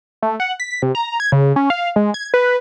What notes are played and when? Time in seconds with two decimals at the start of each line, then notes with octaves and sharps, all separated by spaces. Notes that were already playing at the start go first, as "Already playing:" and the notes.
0.22 A3
0.40 F#5
0.60 B6
0.82 C3
0.95 A#5
1.20 G#6
1.32 C#3
1.56 C#4
1.70 F5
1.96 G#3
2.14 G#6
2.34 B4